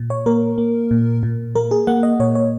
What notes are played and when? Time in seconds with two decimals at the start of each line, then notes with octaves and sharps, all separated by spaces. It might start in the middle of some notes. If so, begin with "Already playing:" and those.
Already playing: A#2
0.10 C#5
0.26 A#3 A#4
0.58 A#3
0.91 A#2
1.23 A#2
1.55 A#3 A#4
1.71 G#4
1.87 A#3 F#5
2.03 D#5
2.20 A#2 C#5
2.35 C#5